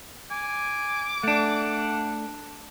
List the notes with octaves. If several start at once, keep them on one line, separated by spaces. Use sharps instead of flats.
G#5 D6
A3 D4 F#5